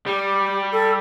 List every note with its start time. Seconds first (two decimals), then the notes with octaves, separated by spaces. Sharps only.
0.07 G3 G4
0.72 A4